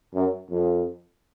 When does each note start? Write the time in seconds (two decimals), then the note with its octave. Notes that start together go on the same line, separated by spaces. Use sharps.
0.14 F#2
0.50 F2